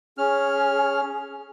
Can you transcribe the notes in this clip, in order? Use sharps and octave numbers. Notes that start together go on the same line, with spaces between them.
C#4 G#4 F6